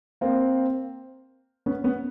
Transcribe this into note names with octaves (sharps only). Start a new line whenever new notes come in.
A#3 C4
B3 C#4
B3 C#4